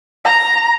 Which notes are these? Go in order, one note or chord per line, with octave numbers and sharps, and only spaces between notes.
A#5